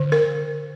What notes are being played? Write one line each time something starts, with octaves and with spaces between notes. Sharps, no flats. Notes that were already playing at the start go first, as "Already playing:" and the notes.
Already playing: D3
A#4